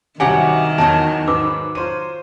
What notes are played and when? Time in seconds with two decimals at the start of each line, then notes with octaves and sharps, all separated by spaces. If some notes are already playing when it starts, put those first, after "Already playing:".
0.20 C2 G2 D#3 F#3 G4 F#5 G#5
0.78 E2 F#3 D#4 F#4 A#4 A5
1.28 G#2 B4 D6 E6
1.75 F#3 F4 C5 D#7